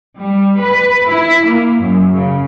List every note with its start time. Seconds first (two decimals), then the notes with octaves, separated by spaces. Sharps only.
0.19 G3
0.59 B4
1.08 E4
1.47 A#3
1.80 F#2
2.13 C#3